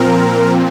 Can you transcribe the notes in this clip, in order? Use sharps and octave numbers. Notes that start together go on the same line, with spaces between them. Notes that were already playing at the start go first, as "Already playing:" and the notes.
Already playing: A#2 F3 C4 A#4